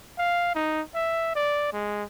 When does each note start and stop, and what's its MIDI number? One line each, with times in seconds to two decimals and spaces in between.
0.18 0.51 77
0.55 0.82 63
0.94 1.34 76
1.35 1.72 74
1.73 2.04 56